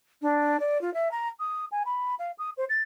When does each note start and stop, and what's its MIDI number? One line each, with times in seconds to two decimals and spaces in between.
0.21 0.59 62
0.59 0.80 74
0.81 0.93 65
0.93 1.08 76
1.11 1.28 82
1.39 1.65 87
1.72 1.83 80
1.85 2.15 83
2.18 2.31 77
2.38 2.50 87
2.57 2.64 72
2.69 2.82 93